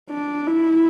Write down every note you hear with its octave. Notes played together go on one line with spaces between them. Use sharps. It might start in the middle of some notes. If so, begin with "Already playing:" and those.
D4
E4